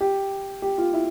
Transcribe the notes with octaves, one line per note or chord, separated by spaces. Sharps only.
G4
G4
F4
E4